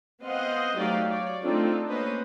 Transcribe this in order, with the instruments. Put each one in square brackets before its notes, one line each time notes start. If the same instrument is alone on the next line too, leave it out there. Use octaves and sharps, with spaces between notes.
[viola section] B3 C4 C5 D#5 F5 F#5
F#3 A3 D#4 G4 D5 F5
C#5 D5
A3 C4 D4 D#4 F4 A4
A#3 C#4 B4 C5 D#5